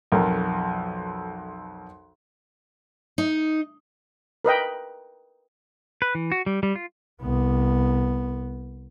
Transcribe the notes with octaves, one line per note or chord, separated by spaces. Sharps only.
B1 F2 A#4
D#4
A#4 B4 D#5 G5
B4
E3
F#4
G3
G3
F4
C2 B3